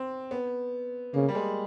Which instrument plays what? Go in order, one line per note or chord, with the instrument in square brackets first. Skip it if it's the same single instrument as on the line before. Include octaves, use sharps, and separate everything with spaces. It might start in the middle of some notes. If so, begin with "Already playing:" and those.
Already playing: [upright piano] C4
B3
[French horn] C#3 [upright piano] A#3
[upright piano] G3
G#3